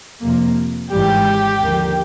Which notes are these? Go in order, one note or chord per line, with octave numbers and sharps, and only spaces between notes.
F2 C3 F3 A#3
G#1 G#2 E3 G3 G4
D#2 D3 F3 A#3